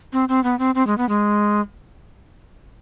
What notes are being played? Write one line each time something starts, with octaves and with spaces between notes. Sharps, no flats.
C4
C4
B3
C4
C4
G#3
B3
G#3